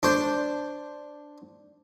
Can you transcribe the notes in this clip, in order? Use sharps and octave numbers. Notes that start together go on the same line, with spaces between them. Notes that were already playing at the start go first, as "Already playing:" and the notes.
D4 C5